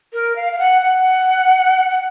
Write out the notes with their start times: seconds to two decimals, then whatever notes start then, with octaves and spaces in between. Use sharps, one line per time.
0.13 A#4
0.36 F5
0.53 F5
0.59 F#5
0.82 F#5
1.90 F#5